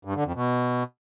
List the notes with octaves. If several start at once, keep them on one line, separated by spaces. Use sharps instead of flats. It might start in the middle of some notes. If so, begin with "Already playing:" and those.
G2
D3
F2
B2